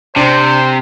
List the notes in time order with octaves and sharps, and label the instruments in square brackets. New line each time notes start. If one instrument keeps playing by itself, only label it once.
[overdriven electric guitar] C3 [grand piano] D4 [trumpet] C5